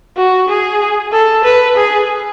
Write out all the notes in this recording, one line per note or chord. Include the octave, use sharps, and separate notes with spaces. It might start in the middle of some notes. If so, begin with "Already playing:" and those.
F#4
G#4
A4
B4
G#4